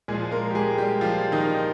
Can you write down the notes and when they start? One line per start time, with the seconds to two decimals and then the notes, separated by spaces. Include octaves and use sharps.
0.08 A#2 G#3 G#4
0.14 F3
0.32 A#3 A#4
0.50 G4
0.55 G#3 G#4
0.78 G3 G4
1.01 F3 F4
1.32 D#3 D#4